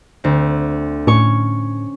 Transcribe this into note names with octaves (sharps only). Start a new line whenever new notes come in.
D2 C4
A2 C#4 C#6